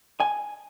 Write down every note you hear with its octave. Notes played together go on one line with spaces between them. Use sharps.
G#5